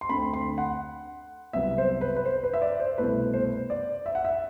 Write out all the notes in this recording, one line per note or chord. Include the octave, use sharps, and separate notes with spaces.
C6
D2 D3 A3 C4 B5
C6
F#5
C2 C3 F#3 B3 E5
C5
B4
B4
C5
B4
E5
D5
C5
C2 B2 A3 E4 B4
C5
D5
E5
F#5
E5